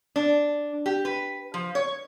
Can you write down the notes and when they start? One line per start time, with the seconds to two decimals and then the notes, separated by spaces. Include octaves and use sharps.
0.16 D4
0.86 G4
1.05 B4
1.54 F3
1.75 C#5